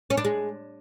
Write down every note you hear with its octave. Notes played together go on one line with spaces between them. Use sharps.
C#4
D4
G#3